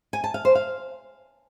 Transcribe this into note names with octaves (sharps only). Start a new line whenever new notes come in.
G#5
A5
F5
C5
F5